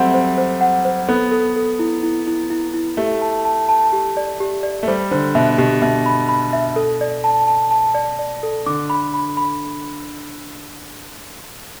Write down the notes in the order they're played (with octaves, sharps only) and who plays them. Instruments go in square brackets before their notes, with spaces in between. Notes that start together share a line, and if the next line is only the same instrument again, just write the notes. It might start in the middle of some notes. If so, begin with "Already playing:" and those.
Already playing: [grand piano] F#3 G3 A3 C4 [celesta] F#5
[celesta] C5
C5
F#5
C5
[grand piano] B3 [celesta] A4
[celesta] A4
A4
E4
E4
E4
E4
E4
[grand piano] A3 [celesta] G4
[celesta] A5
A5
A5
G4
D5
G4
D5
[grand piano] A3
[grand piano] G3 [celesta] C5
[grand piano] D3 [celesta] C5
[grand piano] B2 [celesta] E5
[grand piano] B2 [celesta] G4
[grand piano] B2 [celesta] E5
[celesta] B5
B5
E5
A4
D5
A5
A5
A5
D5
D5
A4
[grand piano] D3 [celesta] D6
[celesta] B5
B5
B5